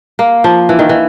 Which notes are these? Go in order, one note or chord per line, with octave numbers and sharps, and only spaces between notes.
A#3
F3
E3
D#3
E3